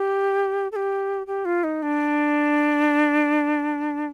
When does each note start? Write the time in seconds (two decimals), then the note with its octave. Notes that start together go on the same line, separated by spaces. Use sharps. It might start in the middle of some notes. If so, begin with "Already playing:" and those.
Already playing: G4
0.72 A4
0.76 G4
1.27 G4
1.45 F4
1.64 D#4
1.83 D4